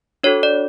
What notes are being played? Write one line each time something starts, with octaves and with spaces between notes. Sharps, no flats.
D4 F#4 A4 C#5
D5